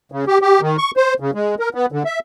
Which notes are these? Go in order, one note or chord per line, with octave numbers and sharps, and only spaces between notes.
C#3
G4
G4
D#3
C#6
C5
C#3
G#3
A#4
B3
D3
E5